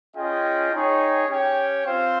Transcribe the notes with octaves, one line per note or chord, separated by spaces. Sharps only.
C#4 F4 G#4 D#5 G5
D#4 G#4 C#5 G5
C#4 G4 C#5 G5
C4 F4 C5 F5